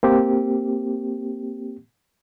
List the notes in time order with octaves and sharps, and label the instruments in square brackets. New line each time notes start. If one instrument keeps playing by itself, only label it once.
[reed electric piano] A#3 C4 G4